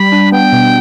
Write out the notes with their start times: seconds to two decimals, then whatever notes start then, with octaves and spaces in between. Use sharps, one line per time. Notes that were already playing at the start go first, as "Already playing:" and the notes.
Already playing: G3 B5
0.12 D4
0.32 B3 G5
0.52 B2